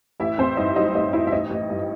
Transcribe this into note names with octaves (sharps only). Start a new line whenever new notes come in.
A1 E4 E5
A1 C4 C5
G2 D#4 D#5
F#3 D#4 D#5
A1 D#4 D#5
A1 E4 E5
E5
A1 D#4 D#5
A1
G2